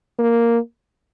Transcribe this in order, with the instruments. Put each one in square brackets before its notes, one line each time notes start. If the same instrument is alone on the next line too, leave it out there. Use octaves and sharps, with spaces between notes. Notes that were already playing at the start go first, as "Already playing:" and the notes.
[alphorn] A#3